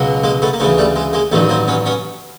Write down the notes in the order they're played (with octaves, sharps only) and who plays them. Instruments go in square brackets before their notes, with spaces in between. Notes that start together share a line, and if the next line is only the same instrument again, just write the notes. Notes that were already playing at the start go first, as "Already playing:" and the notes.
Already playing: [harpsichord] C#2 B2 F#3
G#3 A#3
A3 B3
A#3
D2 C#3 E3 A3 B3
G3 A3
G#3
G#3 A#3
A1 G2 D#3 F#3 A3 B3
A#3 C4
B3 C#4
B3 C#4